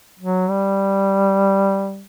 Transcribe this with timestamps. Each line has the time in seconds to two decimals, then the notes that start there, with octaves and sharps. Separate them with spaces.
0.19 F#3
0.50 G3